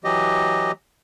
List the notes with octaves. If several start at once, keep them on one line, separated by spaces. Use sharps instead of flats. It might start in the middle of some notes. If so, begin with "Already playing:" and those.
E3 F#3 G4 D#5